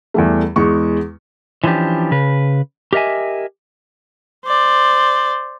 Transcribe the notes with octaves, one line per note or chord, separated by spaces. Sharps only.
E2 G3 A3
E2 G#3 C#6
E3 F3 C#4 D4 G4
C#3 B4
G4 A#4 D#5 E5 G#5
C5 D5